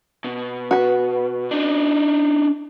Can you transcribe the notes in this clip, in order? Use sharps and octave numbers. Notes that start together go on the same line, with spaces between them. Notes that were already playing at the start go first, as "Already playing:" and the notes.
B2
F#4 B4
D4 D#4